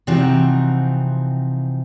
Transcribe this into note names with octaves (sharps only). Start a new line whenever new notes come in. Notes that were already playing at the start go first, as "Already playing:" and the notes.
C3 E3 F3 C4 D#4 F#4